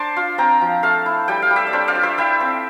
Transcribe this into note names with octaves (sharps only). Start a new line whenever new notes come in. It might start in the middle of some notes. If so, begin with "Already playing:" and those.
Already playing: D4 C5 A5 C6 D6
F4
C4 G5 A#5
F3
A3 F5 A5
E4
G3 G5
F5
G3
E5 G5
D5
D4 C5 E5
D5 F5
F4
C5 E5
E4 E5 G5
C4